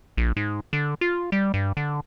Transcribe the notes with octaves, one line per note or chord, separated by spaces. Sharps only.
A#1
G#2
D3
F4
G3
G2
D3